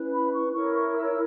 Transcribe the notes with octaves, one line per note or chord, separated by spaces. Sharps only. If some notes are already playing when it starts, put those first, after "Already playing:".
Already playing: C#4 E4 B4
B5
C#6
E4 A#4 C#5 C#6
C#6
E6